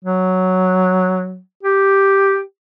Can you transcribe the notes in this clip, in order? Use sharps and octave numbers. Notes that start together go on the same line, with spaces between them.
F#3
G4